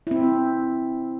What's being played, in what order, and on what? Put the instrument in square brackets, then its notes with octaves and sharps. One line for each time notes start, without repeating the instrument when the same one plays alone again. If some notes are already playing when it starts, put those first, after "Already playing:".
[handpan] C4 E4